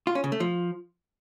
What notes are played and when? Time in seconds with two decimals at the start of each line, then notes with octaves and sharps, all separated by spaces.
0.07 F4
0.15 C#4
0.24 C#3
0.32 A3
0.40 F3